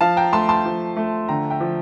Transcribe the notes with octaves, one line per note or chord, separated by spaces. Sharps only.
F3 F5 A5
G5 A#5
A3 A5 C6
A5 C6
F3
A3
D3 G5 A#5
E5 G5
F3